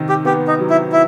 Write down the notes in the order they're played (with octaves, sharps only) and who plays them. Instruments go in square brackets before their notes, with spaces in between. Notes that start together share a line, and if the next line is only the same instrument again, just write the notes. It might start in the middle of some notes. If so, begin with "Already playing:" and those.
Already playing: [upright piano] C3 D#3
[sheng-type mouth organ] G4
[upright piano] B3 [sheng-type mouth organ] G4
[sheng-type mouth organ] D#4
[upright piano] F#3
[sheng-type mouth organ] E4
E4